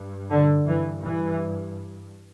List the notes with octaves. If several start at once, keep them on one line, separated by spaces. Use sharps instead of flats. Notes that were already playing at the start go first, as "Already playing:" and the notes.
Already playing: G2
D3
G2 E3
E3